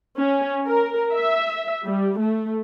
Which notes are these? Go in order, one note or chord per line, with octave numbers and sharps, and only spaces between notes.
C#4
A#4
E5
G3
A3